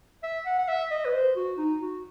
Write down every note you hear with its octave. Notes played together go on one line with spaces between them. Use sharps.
E5
F#5
F#5
E5
D#5
B4
C5
F#4
D#4
F#4